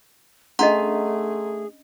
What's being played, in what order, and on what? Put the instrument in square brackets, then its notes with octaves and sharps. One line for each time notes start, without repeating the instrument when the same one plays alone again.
[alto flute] A3 [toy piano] C#4 D4 D#5 [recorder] G#4 [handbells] F#5 A#5 C6